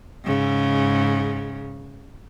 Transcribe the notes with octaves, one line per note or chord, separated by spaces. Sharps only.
G#2 C#3